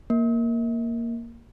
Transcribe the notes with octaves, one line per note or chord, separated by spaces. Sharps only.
A#3